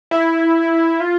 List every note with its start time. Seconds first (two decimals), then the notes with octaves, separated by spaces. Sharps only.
0.11 E4
1.00 F4